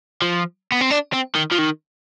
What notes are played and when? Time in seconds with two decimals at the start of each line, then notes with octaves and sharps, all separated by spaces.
0.22 F3
0.72 B3
0.81 C4
0.91 D4
1.13 C4
1.35 D#3
1.52 F3
1.59 D#3